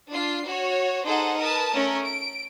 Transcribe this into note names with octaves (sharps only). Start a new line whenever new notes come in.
D4 F4 C7
F#4 C#5
D#4 G#4 A4 C5 F#5
A#4 B4 A5 D#6
A3 C#4 A#4
D7